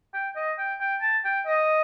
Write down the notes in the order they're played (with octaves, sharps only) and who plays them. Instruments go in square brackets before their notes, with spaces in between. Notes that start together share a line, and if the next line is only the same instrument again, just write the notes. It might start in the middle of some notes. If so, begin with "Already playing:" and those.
[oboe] G5
D#5
G5
G5
A5
G5
D#5